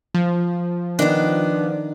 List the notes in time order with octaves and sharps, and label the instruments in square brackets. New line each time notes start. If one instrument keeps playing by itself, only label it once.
[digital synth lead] F3
[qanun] D#3 [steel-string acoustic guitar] B3 D4